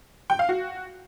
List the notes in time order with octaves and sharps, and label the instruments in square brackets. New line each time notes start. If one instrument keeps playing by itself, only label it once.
[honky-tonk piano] G5
F5
F#4